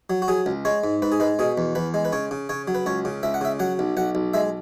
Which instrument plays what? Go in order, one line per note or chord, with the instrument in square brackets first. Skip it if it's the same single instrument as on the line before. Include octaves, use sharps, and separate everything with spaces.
[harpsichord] F#3
F#4
F#3 G#4
C#2
G#3 C#5
G#2
G#2 B4
G#4
G#3 B4
B2 G#4
E2
E2 B4
G#3
B4
C#3 C#5
C#3
C#3 C#5
F#3
B4
C#2 C#5
C#3
C#2 E5
F#5
C#3 E5
F#3 F#5
B1
B1 F#5
B1
G#3 E5